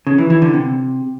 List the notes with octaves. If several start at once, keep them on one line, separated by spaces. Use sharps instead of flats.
C#3
E3
E3
D3
C3